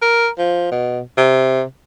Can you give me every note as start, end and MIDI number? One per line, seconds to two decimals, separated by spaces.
0.02 0.28 70
0.38 0.70 53
0.71 1.01 47
1.17 1.63 48